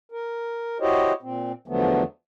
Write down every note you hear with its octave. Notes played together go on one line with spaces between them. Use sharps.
A#4
E4 F#4 G4 C5 C#5 D#5
A#2 C4
E2 D3 F3 F#3 A3 B3